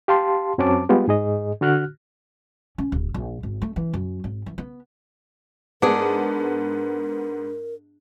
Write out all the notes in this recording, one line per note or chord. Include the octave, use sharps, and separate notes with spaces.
G4 F5 A5 C6
F#2 F#3 C4 C#4 A5 D6
G3 G#3 B3 F4 G4
G#2 G#4 D#5
D3 F#4 F6 F#6
C#4
D1
A#1
G#1
A3
E3
F#2
G#1
E3
B3
G#2 B3 D4 G#4 A#4